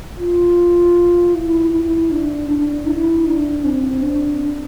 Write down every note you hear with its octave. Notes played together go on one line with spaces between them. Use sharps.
F4
E4
E4
D4
D4
E4
D4
C4
D4